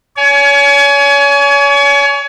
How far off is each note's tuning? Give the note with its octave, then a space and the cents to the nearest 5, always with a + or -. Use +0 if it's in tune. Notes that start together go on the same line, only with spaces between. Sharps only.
C#5 +35 G#5 +25